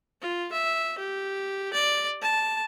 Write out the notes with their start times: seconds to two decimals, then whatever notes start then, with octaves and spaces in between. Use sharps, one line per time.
0.22 F4
0.52 E5
0.98 G4
1.73 D5
2.22 A5